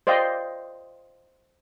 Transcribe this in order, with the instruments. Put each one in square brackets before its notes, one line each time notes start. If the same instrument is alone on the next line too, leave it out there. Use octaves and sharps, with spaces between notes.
[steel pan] C5 D5 D#5 F5 G5